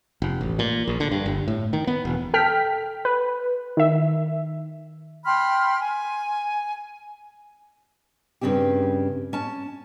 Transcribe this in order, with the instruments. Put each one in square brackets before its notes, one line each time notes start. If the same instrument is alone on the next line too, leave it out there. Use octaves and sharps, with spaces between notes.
[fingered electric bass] F1
A1
A#2
A#1
D3
G2
G1
A2
D#3
B3
E1
[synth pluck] A4 G5 F6 B6
B4
D#3 E5
[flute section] G5 B5 C6 F6
G#5
[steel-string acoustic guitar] G2 C#3 C4 C#4 G4
C#4 A5